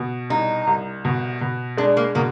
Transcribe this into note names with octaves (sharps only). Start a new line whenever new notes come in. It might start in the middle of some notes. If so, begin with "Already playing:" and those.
Already playing: B2
C2 D#4
C2
B2
B2
G#3 D4
A#3
B2 A#3